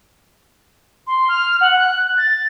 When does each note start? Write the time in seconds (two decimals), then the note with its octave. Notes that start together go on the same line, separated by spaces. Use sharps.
1.07 C6
1.29 F6
1.61 F#5
1.79 F#6
2.18 A6